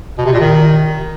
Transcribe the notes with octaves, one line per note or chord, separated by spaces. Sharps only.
B2
C3
A#2
D#3